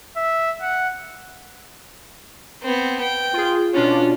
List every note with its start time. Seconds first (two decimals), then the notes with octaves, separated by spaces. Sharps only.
0.17 E5
0.62 F#5
2.62 B3 C4
3.00 G5
3.33 F4 G#4
3.74 B2 C#4 D4 F4